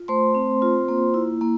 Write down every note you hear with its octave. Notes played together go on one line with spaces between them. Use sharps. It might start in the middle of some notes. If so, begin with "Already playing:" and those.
Already playing: F4
A3 C5 C6
C4
F4
A#3
E4
A#3